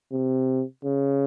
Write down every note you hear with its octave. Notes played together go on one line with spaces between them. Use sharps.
C3
C#3